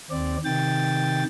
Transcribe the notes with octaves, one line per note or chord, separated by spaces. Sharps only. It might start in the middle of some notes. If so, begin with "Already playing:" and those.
D#2 C4 D5
C3 D#3 G5 A6